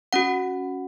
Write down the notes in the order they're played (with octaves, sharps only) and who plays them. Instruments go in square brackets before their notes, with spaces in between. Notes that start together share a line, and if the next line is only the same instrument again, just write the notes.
[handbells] C#4 F#4 F#5